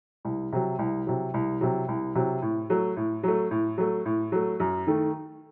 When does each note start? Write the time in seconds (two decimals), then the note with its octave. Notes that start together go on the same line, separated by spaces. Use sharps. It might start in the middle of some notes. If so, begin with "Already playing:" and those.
0.25 C2
0.53 C3 F#3
0.79 C2
1.07 C3 F#3
1.34 C2
1.61 C3 F#3
1.88 C2
2.15 C3 F#3
2.42 A2
2.70 F#3 A3
2.97 A2
3.23 F#3 A3
3.51 A2
3.78 F#3 A3
4.05 A2
4.32 F#3 A3
4.60 F#2
4.87 D#3 A3